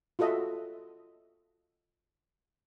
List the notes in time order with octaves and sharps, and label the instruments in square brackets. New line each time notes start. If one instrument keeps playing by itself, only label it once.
[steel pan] F4 F#4 A4 D#5 E5